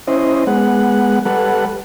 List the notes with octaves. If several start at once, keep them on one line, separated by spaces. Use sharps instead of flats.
C#4 E4 C5 D#5
G#3 B3 F#5
G3 A4 B4 F#5